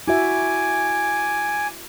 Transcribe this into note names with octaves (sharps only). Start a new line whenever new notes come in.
E4 F#4 E5 G#5 D6